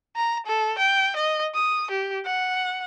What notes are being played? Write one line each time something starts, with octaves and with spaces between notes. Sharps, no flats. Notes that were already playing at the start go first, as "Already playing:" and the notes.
A#5
A4
G5
D#5
D#6
G4
F#5